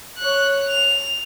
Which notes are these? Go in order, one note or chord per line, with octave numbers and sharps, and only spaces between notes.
C#5 F#6
F7